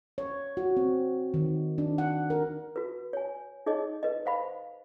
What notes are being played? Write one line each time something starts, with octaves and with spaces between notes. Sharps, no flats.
C#5
F#4
C4
D#3
D4
F#5
A#4
F#4 B4
C#5 G#5
D#4 G#4 C#5 D#5
B4 D#5
C5 F5 B5